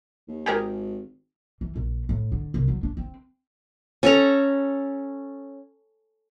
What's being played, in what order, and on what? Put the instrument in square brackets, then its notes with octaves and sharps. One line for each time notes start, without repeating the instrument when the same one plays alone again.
[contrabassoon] D#2
[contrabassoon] G#1 [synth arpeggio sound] G4 G#4 A#4
[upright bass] E3
A#1
A2
D3
C2
F#3
D4
C4
[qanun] C#4 A4 A#5